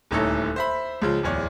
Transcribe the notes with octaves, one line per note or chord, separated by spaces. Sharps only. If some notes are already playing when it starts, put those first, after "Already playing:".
D#1 D2 D#4 E4 A4 C#5
C5 E5 B5
C#2 C#3 F3
D1 E2 C#5 D5